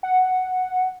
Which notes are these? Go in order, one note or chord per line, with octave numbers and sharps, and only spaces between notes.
F#5